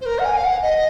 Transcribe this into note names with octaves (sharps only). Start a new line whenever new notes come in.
C5
A#4
F#5
G#5
F5
F#5
D#5